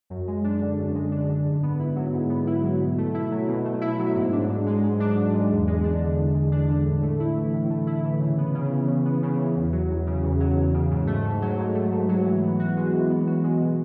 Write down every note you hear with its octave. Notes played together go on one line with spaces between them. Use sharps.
F#2
G#3
D4
D3
F#2
G#3
D4
D3
G#2
B3
E4
F#3
G#2
B3
E4
F#3
B2
A3
E4
F#3
B2
A3
E4
F#3
G#2
D4
G#2
G#3
G#2
D4
G#2
G#3
E2
G#3
D4
D3
E2
G#3
D4
D3
A2
A3
E4
E3
A2
A3
E4
E3
C#3
B3
C#3
E3
C#3
B3
C#3
E3
E2
F#3
E2
C#3
E2
F#3
E2
C#3
G#2
A3
G#2
F#3
G#2
A3
G#2
F#3
E3
B3
F#4
G#3
E3
B3
F#4
G#3
B2